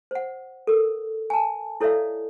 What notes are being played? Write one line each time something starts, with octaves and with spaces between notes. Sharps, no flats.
C5 F#5
A4 A#4
G#5 A5
E4 A4 C#5 D5 E5 F5